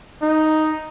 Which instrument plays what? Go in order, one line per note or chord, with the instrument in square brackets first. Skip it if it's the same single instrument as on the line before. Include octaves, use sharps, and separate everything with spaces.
[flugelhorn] D#4